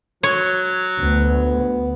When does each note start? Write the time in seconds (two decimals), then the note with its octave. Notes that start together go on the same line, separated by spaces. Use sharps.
0.23 F#3 C#5
1.02 D2 B3